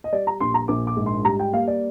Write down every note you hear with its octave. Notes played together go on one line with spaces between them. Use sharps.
D#5
G3 D5
A#5
A#1 C6
A#5
A#1 D6
D6
G#2
C6
G3 A#5
G5
A#3 F5
D5